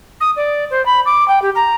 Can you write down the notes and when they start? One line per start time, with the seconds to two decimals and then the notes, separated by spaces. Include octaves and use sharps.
0.20 D#6
0.36 D5
0.70 C5
0.85 B5
1.05 D6
1.28 G5
1.42 G4
1.55 A#5